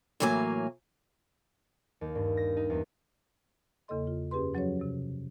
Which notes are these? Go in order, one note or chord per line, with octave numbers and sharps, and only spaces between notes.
A2 E3 F#3 A#3 G#5
D#2
G2
A#6
D#4
E2
E2 C#3 A#3 A4 D#5 C6
F4
F#2 C#4 G4 G#4 B4 C6
F3 F#3 C#4 F#4 G#4 C#5
C3 F#3